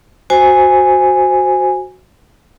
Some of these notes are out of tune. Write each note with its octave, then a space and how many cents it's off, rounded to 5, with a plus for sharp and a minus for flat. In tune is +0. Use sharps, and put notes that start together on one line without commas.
F#4 +0 C5 +0 G#5 -5